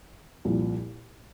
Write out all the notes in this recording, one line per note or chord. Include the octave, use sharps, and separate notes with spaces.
C2 A#2 F3